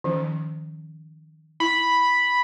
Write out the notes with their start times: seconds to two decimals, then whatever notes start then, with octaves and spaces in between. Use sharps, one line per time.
0.04 D#3 F3 C#4
1.60 E4 B5